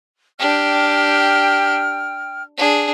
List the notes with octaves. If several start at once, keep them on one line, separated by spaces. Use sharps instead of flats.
D4 G4 G5 F6
D4 G#4